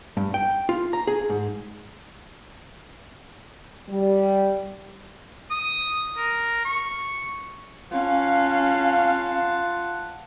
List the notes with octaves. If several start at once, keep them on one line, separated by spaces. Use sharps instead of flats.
G2
G5
F4
A#5
G#4
G#2
G3
D#6
A#4
C#6
C#4 F4 F5 F#5 A5